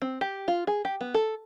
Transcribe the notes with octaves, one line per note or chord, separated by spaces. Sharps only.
C4
G4
F4
G#4
G4
B3
A4